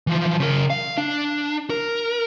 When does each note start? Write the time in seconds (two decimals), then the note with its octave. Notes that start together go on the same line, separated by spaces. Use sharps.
0.07 E3 F3
0.40 C#3 A#4
0.70 F5
0.98 D4
1.70 A#4